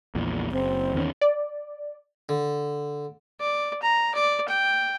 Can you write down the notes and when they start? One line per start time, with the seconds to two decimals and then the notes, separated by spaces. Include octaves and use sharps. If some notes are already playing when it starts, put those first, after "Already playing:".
0.15 A#1 E2 A#2
0.52 F#1 C4
0.94 E2 D#3 C#4
1.21 D5
2.29 D3
3.40 D5
3.82 A#5
4.15 D5
4.48 G5